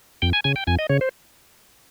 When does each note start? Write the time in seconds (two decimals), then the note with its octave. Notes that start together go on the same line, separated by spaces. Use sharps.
0.22 F2 G5
0.33 G#5
0.44 C#3 G#5
0.56 G5
0.67 F2 G#5
0.79 D#5
0.89 C#3 C#5
1.01 C5